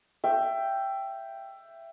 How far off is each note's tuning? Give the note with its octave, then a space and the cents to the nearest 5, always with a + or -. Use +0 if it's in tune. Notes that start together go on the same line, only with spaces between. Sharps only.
E5 +20 G5 +0